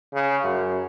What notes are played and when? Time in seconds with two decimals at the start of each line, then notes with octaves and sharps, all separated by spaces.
0.13 C#3
0.44 F#2